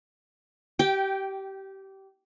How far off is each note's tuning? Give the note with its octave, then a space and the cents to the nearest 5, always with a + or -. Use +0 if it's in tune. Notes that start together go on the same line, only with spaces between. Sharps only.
G4 -20 G5 +0